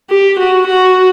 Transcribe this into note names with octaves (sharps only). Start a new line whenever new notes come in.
G4
F#4
F#4